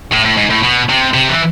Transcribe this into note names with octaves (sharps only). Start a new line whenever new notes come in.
A2
A2
G#2
A2
B2
C3
C3
E3